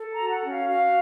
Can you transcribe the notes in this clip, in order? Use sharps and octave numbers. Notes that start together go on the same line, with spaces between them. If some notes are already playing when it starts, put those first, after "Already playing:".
Already playing: A4
A#5
F#4
F#5
C#4
F5
F#4 F5